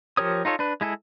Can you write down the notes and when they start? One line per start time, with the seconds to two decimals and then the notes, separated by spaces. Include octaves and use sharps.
0.17 F3 G4 A#4 C#5 D#6
0.45 D#4 F4 A4 C#5
0.59 D4 B4
0.81 G#3 E4 G#4 A4